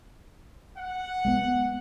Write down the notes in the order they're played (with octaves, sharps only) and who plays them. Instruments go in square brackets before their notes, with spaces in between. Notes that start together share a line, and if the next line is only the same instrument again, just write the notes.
[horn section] F#5
[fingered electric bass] G#3 A#3 B3